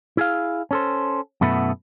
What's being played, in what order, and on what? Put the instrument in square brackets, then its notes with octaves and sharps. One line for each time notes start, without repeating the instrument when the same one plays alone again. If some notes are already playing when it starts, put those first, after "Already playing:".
[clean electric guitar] E4 G#4 F5
C#4 A4 C5
F#2 B2 A3 B3 E4